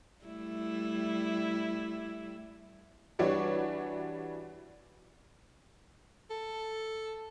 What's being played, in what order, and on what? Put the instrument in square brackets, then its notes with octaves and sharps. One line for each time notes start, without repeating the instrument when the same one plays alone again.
[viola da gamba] G3 A3 E4
[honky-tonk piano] E3 G3 D4 F#4 C#5
[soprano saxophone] A4